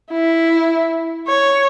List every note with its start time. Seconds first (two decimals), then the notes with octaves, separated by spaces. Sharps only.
0.11 E4
1.28 C#5